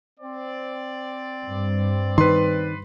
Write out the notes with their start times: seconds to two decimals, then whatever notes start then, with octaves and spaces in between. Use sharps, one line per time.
0.19 C4 D5
1.45 G2
2.18 D#3 B4 C6